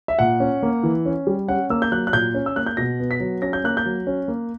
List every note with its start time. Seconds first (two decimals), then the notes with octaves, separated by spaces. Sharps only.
0.08 E5
0.19 A#2 F#5
0.40 C#4
0.63 A#3
0.83 E3
1.06 C#4
1.27 G3
1.48 C#4 F#5
1.70 A#3 E6
1.82 G6
1.92 F#3 F#6
2.07 F#6
2.13 A#2 G6
2.34 C#4
2.46 E6
2.56 A#3 F#6
2.66 G6
2.77 B2 A#6
3.00 B3
3.11 B6
3.20 F#3
3.42 C#4 A#6
3.53 G6
3.64 A#3 F#6
3.77 G6
3.86 F#3
4.07 C#4
4.28 A#3